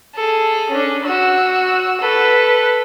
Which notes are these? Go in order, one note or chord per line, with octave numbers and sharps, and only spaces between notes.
G#4 A4
C#4 D4
F#4 E6
A4 B4